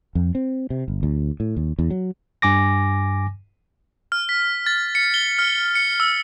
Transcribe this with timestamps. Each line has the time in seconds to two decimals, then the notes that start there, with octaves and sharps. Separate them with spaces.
0.15 F2
0.35 C4
0.70 C3
0.88 G1
1.03 D2
1.40 A2
1.57 D#2
1.79 E2
1.90 F#3
2.42 G2 G#5 D6 A#6
4.12 F6
4.29 B6
4.66 A6
4.95 C#7
5.14 G7
5.39 F6
5.75 C#7
6.00 E6